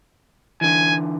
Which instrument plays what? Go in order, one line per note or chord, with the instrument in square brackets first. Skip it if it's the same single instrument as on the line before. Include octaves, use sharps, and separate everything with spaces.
[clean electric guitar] D3 E3 [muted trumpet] G#5